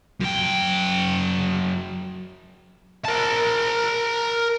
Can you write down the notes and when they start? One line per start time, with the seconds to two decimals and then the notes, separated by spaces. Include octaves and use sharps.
0.21 F#2 G5
3.05 A#4 A5